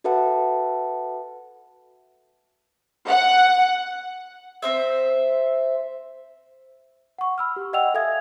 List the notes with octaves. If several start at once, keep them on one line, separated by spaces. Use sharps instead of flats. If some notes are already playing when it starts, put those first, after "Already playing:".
F#4 A4 B4 E5 F#5 A5
F#5
C4 C5 E5
F#5 C#6
B5 E6 F6
G4
D5 D#5 F#5 G5 E6 F7
A4 E5 F5 G#5 D#6 G#6